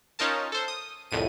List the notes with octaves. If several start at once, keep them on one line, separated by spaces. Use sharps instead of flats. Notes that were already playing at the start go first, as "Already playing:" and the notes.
C#4 D#4 F4 A#4 A5
A4 C5
D#6
C2 F2 A2 D#7